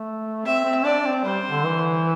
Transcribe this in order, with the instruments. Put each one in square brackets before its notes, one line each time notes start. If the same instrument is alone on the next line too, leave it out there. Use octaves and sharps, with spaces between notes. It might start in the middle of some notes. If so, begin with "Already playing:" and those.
Already playing: [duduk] A3
[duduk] C4 [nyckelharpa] E5
[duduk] C4
[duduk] D4 [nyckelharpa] D5
[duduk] C4
[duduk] G3 [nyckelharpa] C5
[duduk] D3
E3